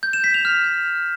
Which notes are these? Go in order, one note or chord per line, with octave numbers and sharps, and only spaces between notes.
G6
E7
B6
F7
F6